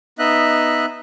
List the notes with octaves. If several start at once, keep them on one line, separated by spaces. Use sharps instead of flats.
B3 D#4 D#5 E5 F#6